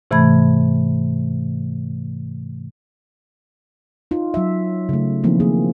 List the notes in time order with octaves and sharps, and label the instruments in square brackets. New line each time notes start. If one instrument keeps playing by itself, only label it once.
[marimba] G#2 C3 E3 A3 B5 G#6
[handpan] D#4 F4
F#3 E5
C#3 A3
D#3 F3 A#3 C4 D#4 E4
A#3 G#4